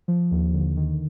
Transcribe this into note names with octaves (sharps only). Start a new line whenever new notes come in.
F3
D#2
D3
D#3